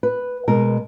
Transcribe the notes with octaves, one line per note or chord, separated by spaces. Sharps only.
B4
B2 G#3 A#4